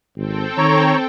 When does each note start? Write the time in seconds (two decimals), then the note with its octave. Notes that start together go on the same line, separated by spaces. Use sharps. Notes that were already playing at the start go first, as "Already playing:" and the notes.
0.16 G#1 C4 A4 G5
0.58 D#3 C#5 A#5 C#6